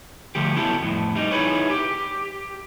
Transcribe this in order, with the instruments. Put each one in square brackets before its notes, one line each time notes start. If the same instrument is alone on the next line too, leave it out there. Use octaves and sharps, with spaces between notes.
[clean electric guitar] D3 F3 A3 G4
F#3 B3 E4 G4 A4
F2 A2
G3 D#4
D#4 E4 F#4 G#4 B4 C#5
G4